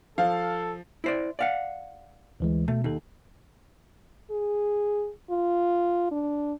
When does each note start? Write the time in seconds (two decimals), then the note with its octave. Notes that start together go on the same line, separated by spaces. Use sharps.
0.18 F3 A4 F5
1.04 E4 C5 D5
1.39 D5 F5 F#5
2.40 D2 E3 G#3
2.68 B2 A3
2.84 D#2 D#4 A4
4.31 G#4
5.30 F4
6.11 D4